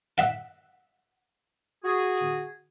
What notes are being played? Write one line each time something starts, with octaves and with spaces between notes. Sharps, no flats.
E5 F#5
F#4 G#4